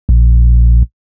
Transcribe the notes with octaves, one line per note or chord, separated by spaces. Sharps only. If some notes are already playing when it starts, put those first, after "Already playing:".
A#1